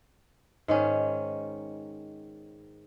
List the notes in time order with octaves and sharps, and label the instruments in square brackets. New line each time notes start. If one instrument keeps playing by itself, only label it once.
[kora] G#2 D#3 C#4